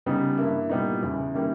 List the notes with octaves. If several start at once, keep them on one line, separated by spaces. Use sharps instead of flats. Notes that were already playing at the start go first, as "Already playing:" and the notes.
C#3 G3 B3 D#4
G2 E3 A#3 E4
A#2 G3 B3 D#4
E2 C#3 E3
D#3 G3 A#3 C#4 E4